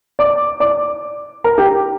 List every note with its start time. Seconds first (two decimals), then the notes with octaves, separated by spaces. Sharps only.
0.19 D5 D6
0.60 D5 D6
1.44 A#4 A#5
1.58 G4 G5